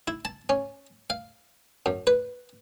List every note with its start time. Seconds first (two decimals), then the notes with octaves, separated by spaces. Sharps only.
0.08 E4
0.25 A5
0.49 C#4
1.10 F5
1.86 F#2
2.07 B4